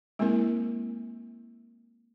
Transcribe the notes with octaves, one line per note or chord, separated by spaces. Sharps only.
G#3 A#3 C4 E4 A#4